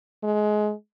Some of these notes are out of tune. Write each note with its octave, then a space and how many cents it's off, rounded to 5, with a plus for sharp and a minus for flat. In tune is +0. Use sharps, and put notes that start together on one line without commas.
G#3 +25